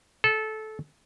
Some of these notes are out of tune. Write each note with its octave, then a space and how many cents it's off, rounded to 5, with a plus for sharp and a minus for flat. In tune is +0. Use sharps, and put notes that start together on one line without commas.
A4 -20